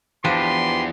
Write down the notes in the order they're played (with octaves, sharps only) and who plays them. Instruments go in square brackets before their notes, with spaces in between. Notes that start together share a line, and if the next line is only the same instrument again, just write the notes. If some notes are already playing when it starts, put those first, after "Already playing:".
[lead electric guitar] E2 [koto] F3 D4 [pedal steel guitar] G4 B4 [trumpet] C6